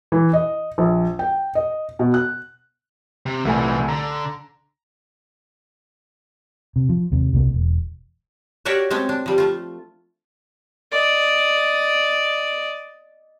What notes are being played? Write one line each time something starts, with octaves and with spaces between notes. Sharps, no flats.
E3
D#5
A#1
G5
D#5
B2
F#6
C3
C2 A#2 E3 A3 G#5
D3 A#5
C3
F3
D#2 C3
C2 C3 A#3
E1
F#4 G4 A#4 C#5 D5 E5
G#3 A3 C4 C#4
D4
F3 G3
A3 F4
D5 D#5